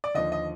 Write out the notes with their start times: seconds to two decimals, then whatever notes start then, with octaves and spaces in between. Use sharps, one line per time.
0.04 D5
0.15 D#2 D3 F3 D#5
0.32 D#5